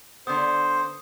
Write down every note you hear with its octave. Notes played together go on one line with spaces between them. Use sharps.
D3 B3 C5 D#6